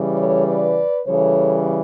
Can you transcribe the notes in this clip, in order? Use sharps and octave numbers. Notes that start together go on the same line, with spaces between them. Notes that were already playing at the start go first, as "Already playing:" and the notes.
Already playing: C#3 E3 G3
A4 C#5
B4 D5
C#3 E3 G3 A4 C#5